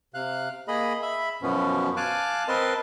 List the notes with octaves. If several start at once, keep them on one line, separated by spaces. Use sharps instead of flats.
C3 F5 F#6
A#3 G#4 D#5 B5
E5 B5
F#2 B2 E3 F3 B3 C#4
F5 G#5 A5 D6 F#6
C4 A#4 B4 D#5 A5 C6